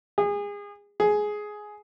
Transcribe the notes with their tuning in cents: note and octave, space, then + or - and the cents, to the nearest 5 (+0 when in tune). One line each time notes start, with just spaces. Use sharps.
G#4 -30
G#4 +10